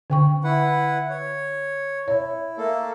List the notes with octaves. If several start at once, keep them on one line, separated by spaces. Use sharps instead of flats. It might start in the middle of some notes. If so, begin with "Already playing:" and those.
D3 G5 C#6
E4 B4 F#5
C#5
E4 C#5
A3 A#3 A4